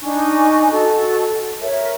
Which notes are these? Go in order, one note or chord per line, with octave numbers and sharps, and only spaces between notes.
D4 D#4 G#5 C#6
F#4 A4 D#5
A#4 C#5 E5